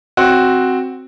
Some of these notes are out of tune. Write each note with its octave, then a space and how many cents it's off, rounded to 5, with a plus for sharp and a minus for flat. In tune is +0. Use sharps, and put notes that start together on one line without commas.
C4 +0 F#4 +0 C#5 +0